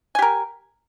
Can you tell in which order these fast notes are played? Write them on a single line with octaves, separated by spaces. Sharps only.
G#5 G4 A#4